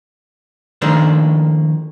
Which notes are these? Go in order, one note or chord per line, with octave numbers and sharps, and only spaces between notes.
D#3 F3 A3 A#3 D4 C5